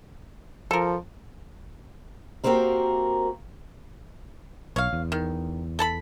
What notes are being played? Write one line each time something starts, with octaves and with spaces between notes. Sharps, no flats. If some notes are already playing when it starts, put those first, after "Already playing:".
F3 A4 A#4
A#3 C4 F#4 G4 A#4 F5
B1 C#5 F5
E2
D#3
A4 A5 B5